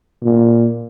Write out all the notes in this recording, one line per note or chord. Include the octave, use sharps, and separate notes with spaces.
A#2